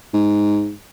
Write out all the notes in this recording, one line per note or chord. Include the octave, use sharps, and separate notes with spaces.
G#2